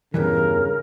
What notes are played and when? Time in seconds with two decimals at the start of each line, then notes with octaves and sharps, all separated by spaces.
0.14 E2 G2 C#3 E3 A#4